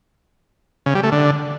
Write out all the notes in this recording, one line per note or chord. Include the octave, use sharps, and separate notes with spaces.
C#3
G3
A3
D3